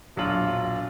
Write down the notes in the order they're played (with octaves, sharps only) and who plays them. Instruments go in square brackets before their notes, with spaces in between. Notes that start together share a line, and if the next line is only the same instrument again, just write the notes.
[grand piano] E1 A#1 F#3 D4 F4 F#7